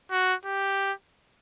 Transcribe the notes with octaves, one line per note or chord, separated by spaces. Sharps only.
F#4
G4